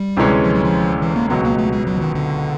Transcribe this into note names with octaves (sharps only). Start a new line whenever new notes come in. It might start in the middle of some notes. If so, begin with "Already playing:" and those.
Already playing: G3
D2 C3 E3 G#3 C#4
F3
F#3
F3
E3
A#3
C#2 B2 F#3 B3
A#3
A3
G#3
F#3
E3
D#3
D3